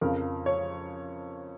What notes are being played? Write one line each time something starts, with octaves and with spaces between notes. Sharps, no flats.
F2 C#3 F3 A#4
C#5